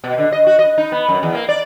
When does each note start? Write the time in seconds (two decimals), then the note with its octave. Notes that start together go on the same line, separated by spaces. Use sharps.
0.04 B2
0.18 D3
0.32 D#5
0.47 F#4
0.59 D#5
0.78 D#4
0.92 B3
1.09 F#2
1.23 E2
1.35 A#3
1.49 D5